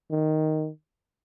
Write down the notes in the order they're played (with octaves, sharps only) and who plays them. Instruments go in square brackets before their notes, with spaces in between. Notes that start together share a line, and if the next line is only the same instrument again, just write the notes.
[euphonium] D#3